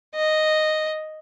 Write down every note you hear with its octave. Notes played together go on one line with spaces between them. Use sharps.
D#5